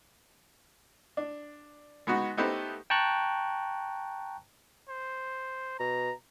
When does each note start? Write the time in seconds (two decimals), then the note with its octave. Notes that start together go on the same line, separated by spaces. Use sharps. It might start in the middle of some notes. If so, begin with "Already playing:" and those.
1.17 D4
2.07 G#3 B3 D#4 F#4
2.37 A3 B3 D#4 G4 B4 C5
2.90 G5 A5 A#5 C#6 F#6
4.89 C5
5.79 B2 A#5